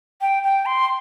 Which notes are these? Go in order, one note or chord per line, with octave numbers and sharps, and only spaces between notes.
G5
G5
C6